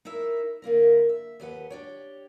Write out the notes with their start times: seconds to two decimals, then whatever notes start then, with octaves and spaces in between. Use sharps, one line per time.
0.05 D#4 E4 A#4 E5
0.62 D3 A#3 E4 A#4
1.09 E5
1.40 D#2 G4 B4 F#5
1.70 D4 G4 C#5